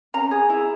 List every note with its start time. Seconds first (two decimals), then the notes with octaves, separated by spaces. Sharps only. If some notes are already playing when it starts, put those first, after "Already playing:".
0.14 C#4 A#5
0.31 G#4
0.50 E4